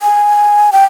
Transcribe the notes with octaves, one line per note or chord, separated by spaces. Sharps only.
G#5
G5